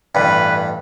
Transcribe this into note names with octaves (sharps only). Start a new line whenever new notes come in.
A1 G2 B4